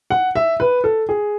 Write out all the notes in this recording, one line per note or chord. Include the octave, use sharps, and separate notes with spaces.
F#5
E5
B4
A4
G#4